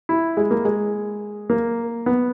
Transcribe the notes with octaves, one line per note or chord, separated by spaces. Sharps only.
E4
G#3
A#3
G#3
A#3
B3